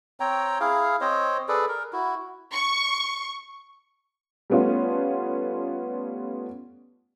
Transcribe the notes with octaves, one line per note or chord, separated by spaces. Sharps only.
C4 C#5 G5 A#5
E4 G#4 F5
C4 C5 C#5 D#5
G#4 A4 B4 D5
A#4
E4 F#4
C#6
G3 A3 B3 C#4 F4